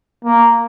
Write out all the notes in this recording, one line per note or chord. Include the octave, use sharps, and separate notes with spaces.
A#3